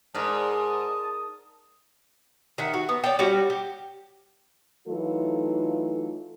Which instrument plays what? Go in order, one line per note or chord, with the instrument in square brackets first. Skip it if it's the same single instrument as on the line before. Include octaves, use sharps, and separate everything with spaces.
[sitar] G#2 [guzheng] A#4 D5 [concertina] A5 [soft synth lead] D#6
[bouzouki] D#3 E5 F#5
F#4
B3
C#5 D5 G5
G3 C#4 F#4
G4
[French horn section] E3 F#3 A3 D#4 F4 A4